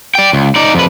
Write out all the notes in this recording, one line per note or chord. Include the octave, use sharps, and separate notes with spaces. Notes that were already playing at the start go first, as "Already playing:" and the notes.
D5 G5
C#2
D#4 D5
F2 B4